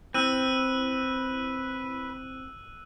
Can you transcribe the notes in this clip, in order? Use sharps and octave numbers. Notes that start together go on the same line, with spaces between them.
C4 E4 B4 E6 F#6 D#7